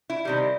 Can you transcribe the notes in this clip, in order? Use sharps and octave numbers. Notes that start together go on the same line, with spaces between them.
E4
C3 D#3 G3